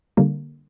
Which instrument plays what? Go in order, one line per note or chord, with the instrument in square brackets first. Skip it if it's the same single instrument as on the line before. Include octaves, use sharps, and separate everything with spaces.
[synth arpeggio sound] D3 G3 A#3